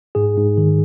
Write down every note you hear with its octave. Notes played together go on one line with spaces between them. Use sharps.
G#2 G#4
G#2
D#3